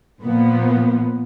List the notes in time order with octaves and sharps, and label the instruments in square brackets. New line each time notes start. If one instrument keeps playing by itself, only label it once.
[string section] A#2 F3 B3